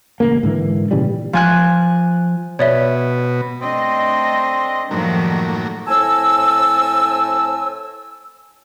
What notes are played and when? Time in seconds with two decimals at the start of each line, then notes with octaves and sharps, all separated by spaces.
0.20 A1 C#3 A#3
0.43 G#2 D3 E3
0.91 A#2 C#3 E3 G3
1.33 F3 G#5 F#6
2.59 B2 C#5 D5 E5
3.62 A3 C4 D4 D#5
4.91 F#2 A2 D#3 F3 G3 A#3
5.88 A2 C4 G#5 A5 E6